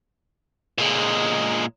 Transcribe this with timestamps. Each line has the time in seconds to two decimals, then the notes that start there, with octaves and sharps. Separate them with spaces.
0.78 A#2 G#3